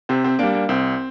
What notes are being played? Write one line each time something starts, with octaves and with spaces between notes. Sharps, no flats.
C3 C4
C4
G3 A#3 D4
A#3
C2 C4